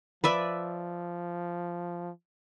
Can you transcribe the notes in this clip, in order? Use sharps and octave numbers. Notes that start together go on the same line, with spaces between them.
F3 B4 D5 E5